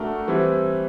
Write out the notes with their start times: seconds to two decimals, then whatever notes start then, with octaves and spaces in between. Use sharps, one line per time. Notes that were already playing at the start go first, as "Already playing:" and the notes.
Already playing: A3 D4 F#4 A#4
0.28 E3 G3 C4 E4